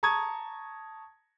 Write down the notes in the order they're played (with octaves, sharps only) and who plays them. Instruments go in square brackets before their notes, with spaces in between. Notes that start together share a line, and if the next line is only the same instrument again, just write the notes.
[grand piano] A5 A#5 C#6 D#6 G#6